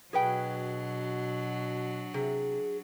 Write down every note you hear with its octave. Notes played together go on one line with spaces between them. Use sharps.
B2 F#3 D4 G#4 B4 G5
C3 G#4